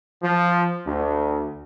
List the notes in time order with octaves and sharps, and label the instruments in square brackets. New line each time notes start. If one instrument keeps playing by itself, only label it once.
[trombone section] F3
D2